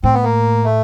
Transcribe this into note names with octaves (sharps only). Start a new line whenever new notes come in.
A2 C4
B3
A#3
A3